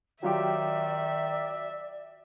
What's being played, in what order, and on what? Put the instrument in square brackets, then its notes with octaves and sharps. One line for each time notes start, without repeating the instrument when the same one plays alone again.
[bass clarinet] D#3 [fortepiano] F#3 F4 G4 [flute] D5 [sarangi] E5